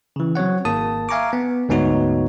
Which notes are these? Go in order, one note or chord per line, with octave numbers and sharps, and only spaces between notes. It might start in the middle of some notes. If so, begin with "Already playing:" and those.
C#3 E3
F#3 C4 C#5 F#5
G#1 A#3 A5 D#6
E5 F5 G#5 A#5 C#6 D6
B3
D2 G#2 B3 D#4 F#4 C#5